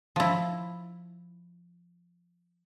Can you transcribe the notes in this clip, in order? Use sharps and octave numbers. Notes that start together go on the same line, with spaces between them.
F3 E4